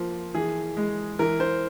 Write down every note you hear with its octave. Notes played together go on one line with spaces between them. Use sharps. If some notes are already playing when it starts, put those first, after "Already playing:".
Already playing: F3 A#3 C5
E3 G#4
G#3
E3 A#4
C5